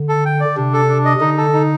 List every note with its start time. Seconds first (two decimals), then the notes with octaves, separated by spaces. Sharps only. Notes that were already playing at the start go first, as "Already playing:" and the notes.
Already playing: D3
0.09 A4
0.25 G5
0.40 D5
0.57 C3 D4
0.73 A4
0.89 D4
1.05 D#5
1.21 D3 D#4
1.37 A4
1.54 D#4